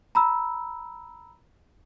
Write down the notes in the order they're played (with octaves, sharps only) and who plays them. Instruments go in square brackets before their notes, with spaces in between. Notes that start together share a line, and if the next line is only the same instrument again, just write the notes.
[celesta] A#5 B5 E6